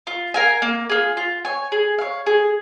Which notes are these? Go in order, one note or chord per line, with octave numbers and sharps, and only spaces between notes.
F4
A#4 F5 G#5
A#3
F4 G#4
F4
C#5 G#5
G#4
C#5 F5
G#4